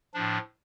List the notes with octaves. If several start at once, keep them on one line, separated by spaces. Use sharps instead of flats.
A2 F3 D4